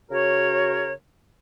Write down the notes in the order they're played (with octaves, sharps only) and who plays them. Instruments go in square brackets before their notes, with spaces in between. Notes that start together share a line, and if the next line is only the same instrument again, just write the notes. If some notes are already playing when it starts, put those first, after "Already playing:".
[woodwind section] C#3 F#4 A#4 C#5